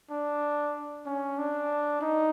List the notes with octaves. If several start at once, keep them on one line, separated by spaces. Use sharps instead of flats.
D4
C#4
D4
D#4